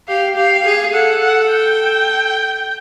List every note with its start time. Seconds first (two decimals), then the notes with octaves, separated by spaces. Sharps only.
0.08 G4 F5
0.36 G4 F5
0.65 G#4
0.93 A4 F#5
1.22 F#5
1.50 G5